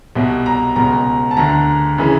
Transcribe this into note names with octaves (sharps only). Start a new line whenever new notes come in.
C2 B2
A#5
C#2 B2 A#5
A5
D2 D3 A#5
C#3 E3